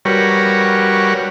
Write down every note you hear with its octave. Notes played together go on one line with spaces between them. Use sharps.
G3 F#4 A#4 B4 C#5